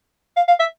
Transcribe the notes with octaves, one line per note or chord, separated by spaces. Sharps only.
F5
F5
E5